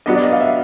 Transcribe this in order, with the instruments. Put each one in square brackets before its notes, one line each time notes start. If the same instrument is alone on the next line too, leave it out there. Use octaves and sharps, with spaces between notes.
[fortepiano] F#3 B3 D4 [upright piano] D#5
[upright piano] D5
D#5
F5
E5